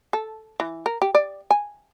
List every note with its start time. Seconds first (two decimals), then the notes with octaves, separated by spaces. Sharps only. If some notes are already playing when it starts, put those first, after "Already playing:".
0.13 A4
0.60 E3
0.86 A#4
1.02 G4
1.15 D5
1.51 G#5